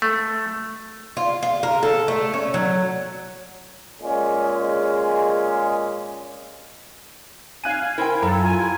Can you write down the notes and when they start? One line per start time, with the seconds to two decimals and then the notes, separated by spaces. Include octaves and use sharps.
0.02 A3
1.17 F4
1.43 F4
1.63 A#4
1.83 A4
2.08 A3
2.34 C#4
2.54 F#3
4.02 A#2 G#3 C#4 G#4
7.64 F5 G#5 F#6 D#7
7.98 E4 A#4 C5 G5
8.22 F#2 E4 A4 A#5
8.42 F4 G#5
8.60 G4